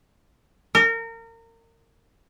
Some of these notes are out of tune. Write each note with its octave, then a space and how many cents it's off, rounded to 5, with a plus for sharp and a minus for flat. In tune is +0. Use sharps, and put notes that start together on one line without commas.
A#4 -30